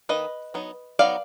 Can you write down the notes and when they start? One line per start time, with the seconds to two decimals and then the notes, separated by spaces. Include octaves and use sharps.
0.09 D#3 A#3 D#4 B4 D#5
0.54 F#3 B3 D#4
0.99 F#3 B3 D#4 D5 F5